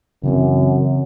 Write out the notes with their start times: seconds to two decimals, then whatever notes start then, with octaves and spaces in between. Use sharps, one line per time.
0.23 F#2 C#3 E3 C4